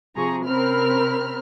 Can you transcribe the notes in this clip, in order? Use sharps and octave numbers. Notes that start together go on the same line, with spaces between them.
C3 F3 G#4 A#5 C#6
C3 C4 C#4 A#4 B5 F6